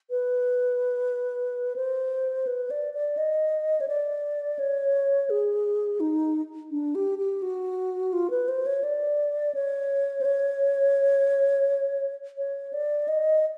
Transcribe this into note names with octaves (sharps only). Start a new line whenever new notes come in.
B4
C5
B4
D5
D5
D#5
C#5
D5
C#5
G#4
D#4
D4
G4
G4
F#4
F4
B4
C5
C#5
D5
C#5
C5
C#5
C#5
D5
D#5